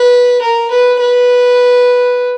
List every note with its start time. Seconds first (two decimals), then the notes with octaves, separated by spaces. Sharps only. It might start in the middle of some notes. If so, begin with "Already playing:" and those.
Already playing: B4
0.41 A#4
0.71 B4
1.00 B4